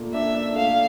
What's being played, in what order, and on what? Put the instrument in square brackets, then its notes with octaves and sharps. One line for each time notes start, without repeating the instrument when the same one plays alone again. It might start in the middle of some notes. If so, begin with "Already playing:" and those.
Already playing: [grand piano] A#2 A3
[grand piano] D4 [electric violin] E5
[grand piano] D4
[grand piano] A3 [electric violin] F5